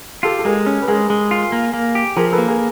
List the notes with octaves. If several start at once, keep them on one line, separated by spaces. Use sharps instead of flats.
F4 G4 A4
A4
G#3 G#4 A#4
C#4
B4
G#3 G#4 A#4
G#3
F4
A#3
A#3
G4
F3 G#4 A#4
A4 B4
A#3
G#4 A#4